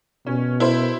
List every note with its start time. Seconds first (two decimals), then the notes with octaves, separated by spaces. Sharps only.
0.26 B2 C#4
0.60 E4 C5